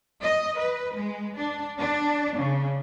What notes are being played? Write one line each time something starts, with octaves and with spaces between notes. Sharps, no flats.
D#5
B4
G#3
D4
D4
C#3